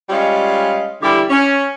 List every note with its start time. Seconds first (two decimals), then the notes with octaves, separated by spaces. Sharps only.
0.10 G3 G#3 C#4 F4 D#5 F5
1.02 D3 E3 G3 E4 G4
1.30 C#4